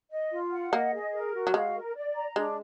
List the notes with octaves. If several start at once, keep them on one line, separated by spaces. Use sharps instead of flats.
D#5
F4
F#5
A#3 D#5
G#4
A#4
F#4
F#3
G#3 F5
A#4
D5
A#5
G#3 D4